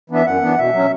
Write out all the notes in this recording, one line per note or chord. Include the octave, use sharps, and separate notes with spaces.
E3 B3 D4 E5
F#2 F#5
E3 B3 D4
B2 E5
F#3 C#4